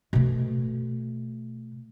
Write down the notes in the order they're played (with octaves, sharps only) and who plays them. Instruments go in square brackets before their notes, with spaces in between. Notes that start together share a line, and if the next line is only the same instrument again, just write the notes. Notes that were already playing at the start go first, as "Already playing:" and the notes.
[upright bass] B2 A3